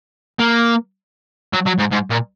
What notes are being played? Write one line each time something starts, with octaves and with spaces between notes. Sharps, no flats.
A#3
F#3
F#3
G#2
G#2
A#2